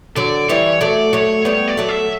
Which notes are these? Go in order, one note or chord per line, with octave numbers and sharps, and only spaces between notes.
D3 F#3 D5
E3 G3 C#5
F#3 A3 D5
F#3 A3 C#5
G3 B3 C#5
D5
F#3 A3
E5